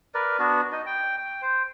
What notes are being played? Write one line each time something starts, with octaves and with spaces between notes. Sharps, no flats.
A#4 B4 D5
B3 D4 F#4
D#4 D#5
G5
G5
C5